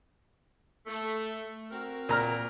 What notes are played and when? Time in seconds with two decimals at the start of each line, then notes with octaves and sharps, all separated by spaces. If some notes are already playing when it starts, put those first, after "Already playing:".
0.86 A3
1.71 C4 F#4 A#4
2.09 A#2 A#5 F6